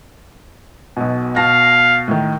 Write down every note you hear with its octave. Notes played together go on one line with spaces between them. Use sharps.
B1 B2
B2 F5 A5 A#6
A2 D#3